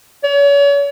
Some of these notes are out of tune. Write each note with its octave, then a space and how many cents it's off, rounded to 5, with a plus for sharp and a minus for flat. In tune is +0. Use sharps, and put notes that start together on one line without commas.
C#5 +40